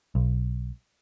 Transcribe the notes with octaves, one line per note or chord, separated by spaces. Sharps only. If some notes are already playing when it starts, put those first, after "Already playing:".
B1